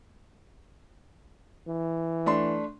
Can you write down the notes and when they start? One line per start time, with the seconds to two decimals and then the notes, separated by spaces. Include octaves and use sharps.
1.68 E3
2.26 A3 D4 C6